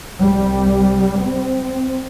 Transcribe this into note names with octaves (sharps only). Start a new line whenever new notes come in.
C2 G3
C4